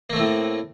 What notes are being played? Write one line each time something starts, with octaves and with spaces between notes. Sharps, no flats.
A2 A3 A#3 C4